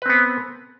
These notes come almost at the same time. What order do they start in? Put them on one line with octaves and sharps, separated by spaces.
B4 C4 B3